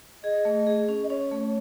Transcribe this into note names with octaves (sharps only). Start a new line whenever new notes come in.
G#4 D#5
A3
G#4
C#4
D#5
C#4 C#5
A3
C#5